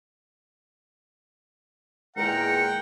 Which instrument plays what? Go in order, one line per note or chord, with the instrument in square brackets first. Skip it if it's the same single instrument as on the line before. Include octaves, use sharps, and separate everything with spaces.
[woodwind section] E2 A#4 [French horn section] A#2 D#3 G#3 [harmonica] F#5 G5 [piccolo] C#7